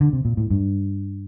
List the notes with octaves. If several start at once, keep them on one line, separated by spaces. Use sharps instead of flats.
D3
C3
A#2
A2
G2